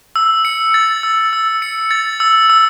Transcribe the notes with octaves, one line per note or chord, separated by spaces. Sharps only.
E6
C#7
A6
E6
E6
C#7
A6
E6
E6